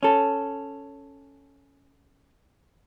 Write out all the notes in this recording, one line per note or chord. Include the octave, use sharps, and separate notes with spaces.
C#4 A4